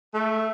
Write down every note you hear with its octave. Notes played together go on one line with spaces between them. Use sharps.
A3